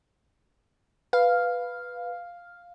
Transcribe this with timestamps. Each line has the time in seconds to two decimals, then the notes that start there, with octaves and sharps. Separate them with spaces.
1.13 B4 F5